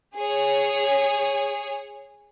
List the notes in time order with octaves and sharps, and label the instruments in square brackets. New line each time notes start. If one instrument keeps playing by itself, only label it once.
[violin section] G#4 C#5